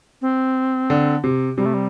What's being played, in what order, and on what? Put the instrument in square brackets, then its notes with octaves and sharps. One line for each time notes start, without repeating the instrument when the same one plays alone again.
[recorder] C4
[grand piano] D3
C3
[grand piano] C3 [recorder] G3
[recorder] A3
G3